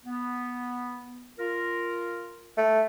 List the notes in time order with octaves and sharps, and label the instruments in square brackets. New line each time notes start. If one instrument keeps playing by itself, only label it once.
[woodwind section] B3
F4 A#4
[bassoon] A3